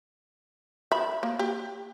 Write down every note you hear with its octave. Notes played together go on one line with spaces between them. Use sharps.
E5 B5
A#3
G4